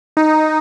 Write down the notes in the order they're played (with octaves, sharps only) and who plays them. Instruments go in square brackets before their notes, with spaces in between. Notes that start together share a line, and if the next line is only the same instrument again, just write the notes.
[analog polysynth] D#4